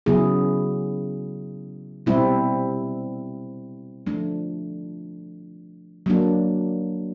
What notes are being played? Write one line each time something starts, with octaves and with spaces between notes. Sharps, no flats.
C#3 F#3 B3 E4 G#4
B2 G3 C4 E4
F3 A3 D4
F#3 A#3 D4